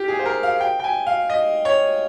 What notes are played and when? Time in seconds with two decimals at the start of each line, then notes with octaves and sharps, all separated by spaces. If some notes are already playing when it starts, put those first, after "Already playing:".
Already playing: F4 G4
0.08 G#4
0.19 C5
0.26 A#4
0.43 F5
0.60 G5
0.80 G5
0.84 G#5
1.07 F5
1.30 D#5
1.65 C#5